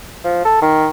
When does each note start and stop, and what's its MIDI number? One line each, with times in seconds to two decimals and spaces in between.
0.24 0.43 53
0.45 0.60 69
0.62 0.89 51